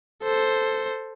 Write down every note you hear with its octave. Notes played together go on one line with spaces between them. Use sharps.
A4 C5